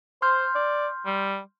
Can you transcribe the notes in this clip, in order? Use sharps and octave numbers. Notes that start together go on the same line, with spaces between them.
C5 C6 F6 G6
D5
G3